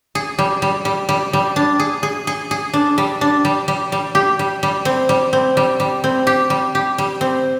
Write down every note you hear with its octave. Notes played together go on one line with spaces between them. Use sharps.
G#4
G3
G3
G3
G3
G3
D4
G#4
G#4
G#4
G#4
D4
G3
D4
G3
G3
G3
G4
G3
G3
C4
G3
C4
G3
G3
C4
G4
G3
G4
G3
C4